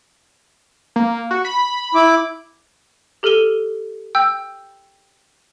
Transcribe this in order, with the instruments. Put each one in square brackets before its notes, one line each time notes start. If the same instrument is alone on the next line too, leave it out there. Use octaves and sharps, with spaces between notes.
[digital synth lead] A#3
F#4
B5
[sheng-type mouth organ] E4 D6
[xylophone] G4 A4 F6 D#7 G7
G5 E6 G6